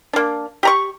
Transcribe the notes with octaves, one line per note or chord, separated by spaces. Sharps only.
A#3 D4
G4 A#5 C#6